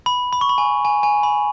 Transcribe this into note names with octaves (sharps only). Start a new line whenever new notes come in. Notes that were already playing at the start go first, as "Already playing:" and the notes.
B5
B5
C#6
B5
G#5
G#5
G#5
B5